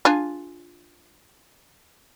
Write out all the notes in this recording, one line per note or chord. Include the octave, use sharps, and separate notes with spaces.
D4 F4 G#4